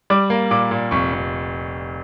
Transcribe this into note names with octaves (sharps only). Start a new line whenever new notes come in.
G3 D6
A#3
A#2 D6
A#2
F1 C#6
F1